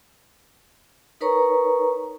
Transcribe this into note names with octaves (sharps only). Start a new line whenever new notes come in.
D#4 A#4 B4 C#5 A#5 C#6